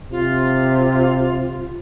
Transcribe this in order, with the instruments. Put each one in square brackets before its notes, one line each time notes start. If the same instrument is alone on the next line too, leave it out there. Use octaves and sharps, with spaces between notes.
[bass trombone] C3 [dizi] F4